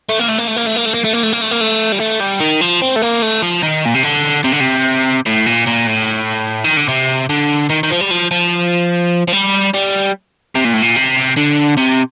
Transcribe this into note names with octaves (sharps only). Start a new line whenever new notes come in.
A3
A#3
A3
A#3
A3
A#3
A3
A#3
A3
A#3
A3
A#3
A3
A#3
A3
A#3
A3
G3
A3
G3
D#3
F3
C4
A3
A#3
A3
F3
D#3
A#2
C3
D3
C3
D3
C3
A2
A#2
A#2
A2
D#3
D3
C3
D3
D#3
D#3
F3
G3
F3
F3
F3
G3
G3
C3
A#2
A2
A#2
C3
D3
C3